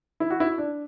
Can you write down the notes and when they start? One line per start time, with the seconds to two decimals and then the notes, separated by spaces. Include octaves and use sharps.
0.20 E4
0.30 F#4
0.40 E4
0.58 D4